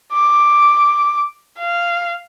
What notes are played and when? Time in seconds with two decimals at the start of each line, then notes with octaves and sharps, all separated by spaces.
0.13 D6
1.58 F5